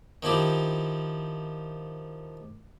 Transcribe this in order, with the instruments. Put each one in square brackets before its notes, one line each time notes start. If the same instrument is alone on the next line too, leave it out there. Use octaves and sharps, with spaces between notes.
[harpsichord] D#3 F3 E4 G4